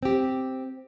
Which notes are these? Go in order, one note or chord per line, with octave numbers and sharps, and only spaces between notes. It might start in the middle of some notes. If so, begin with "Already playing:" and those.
C4 G4